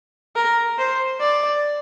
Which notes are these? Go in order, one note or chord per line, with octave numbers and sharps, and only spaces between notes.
A#4
C5
D5